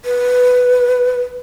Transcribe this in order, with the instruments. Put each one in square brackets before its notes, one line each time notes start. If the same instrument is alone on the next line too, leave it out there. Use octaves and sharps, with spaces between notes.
[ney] B4